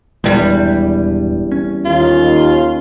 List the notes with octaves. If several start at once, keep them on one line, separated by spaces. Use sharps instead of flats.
D#1 E2 G2 G3 G#3
C#4
D#2 F4